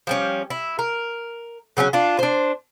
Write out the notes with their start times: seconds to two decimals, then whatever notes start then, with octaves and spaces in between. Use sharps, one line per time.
0.07 F3 G3 C#4
0.50 E4
0.79 A#4
1.77 C#3 F#3 B3 C#4
1.93 D4 F4
2.19 D4 C5